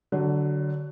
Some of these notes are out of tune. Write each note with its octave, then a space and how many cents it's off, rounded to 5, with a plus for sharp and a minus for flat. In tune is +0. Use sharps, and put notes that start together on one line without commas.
D3 +0 F#3 +20